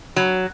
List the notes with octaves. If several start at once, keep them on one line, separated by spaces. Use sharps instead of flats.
F#3